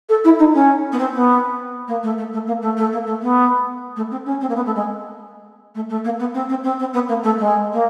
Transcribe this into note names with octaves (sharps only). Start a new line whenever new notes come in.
A4
E4
D#4
C#4
B3
C4
B3
A#3
A3
A3
A3
A#3
A3
A3
A#3
A3
B3
A3
C4
C#4
C4
A#3
B3
A3
G#3
A3
A3
A#3
B3
C4
C4
C4
C4
B3
A#3
A3
G#3
A#3